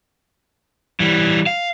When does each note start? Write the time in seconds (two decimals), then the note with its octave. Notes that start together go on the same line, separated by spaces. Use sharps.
1.00 E3 G3
1.46 F5